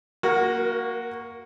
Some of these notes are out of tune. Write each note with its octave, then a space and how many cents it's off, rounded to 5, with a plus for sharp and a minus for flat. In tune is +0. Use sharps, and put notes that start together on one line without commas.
A#3 +0 F#4 +0 A#4 +40